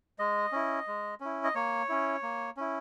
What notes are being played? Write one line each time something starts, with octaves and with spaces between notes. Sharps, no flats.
G#3 D#5
C#4 E4
G#3
C#4 E4
D#5
A#3 C#5
C#4 E4
A#3
C#4 E4